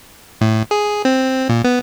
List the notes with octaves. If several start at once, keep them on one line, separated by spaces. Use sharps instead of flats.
A2
G#4
C4
A#2
B3